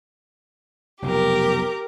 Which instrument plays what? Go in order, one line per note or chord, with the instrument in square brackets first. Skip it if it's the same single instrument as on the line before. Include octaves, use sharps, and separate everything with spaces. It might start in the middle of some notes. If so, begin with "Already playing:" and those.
[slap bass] F1 B1 F2 [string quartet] G4 A#4